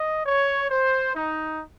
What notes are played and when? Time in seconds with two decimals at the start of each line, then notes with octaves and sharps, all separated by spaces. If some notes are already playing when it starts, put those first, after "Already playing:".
Already playing: D#5
0.25 C#5
0.70 C5
1.15 D#4